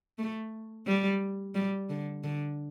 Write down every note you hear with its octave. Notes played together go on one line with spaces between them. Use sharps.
A3
G3
G3
D3
D3